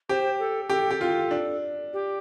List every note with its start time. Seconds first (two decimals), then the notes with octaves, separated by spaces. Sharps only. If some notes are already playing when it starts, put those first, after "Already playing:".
0.09 G4 C5
0.39 A4
0.70 G4 A4
0.91 G4
1.01 F4
1.31 D4
1.93 G4